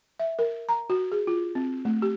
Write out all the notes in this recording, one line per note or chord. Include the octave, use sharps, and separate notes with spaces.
E5
A#4
A#5
F#4
G#4
F4
C4
A3
G4